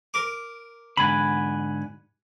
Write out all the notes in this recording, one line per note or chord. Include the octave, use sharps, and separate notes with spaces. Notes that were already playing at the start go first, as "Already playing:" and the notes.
A#4 D6
G#2 D3 F#5 G#5 B5